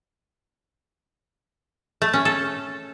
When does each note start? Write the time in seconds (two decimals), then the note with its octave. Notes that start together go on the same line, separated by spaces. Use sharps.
2.02 A3
2.13 C#4
2.25 A4